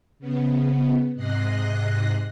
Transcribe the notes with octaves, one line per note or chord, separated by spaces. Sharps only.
C#3 B3
G#2 C3 D#5 F#6 A#6 C7